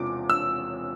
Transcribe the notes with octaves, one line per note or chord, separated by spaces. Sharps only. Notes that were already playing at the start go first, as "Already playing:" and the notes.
Already playing: E1 E2 C3 F3 D6
E6